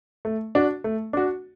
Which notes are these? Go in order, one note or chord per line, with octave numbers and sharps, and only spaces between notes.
A3
D4 F#4
A3
D4 F#4